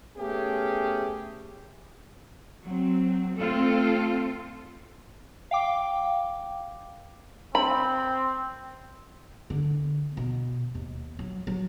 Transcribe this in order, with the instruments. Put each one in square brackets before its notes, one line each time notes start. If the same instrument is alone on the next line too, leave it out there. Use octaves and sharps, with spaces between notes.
[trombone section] A3 B3 C#4 G4 G#4
[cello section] F#3 C4
A3 C4 F4 A4
[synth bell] F5 G5 D6
[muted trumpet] C4 [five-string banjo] B5
[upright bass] D3
B2
D#2
F#3
F#3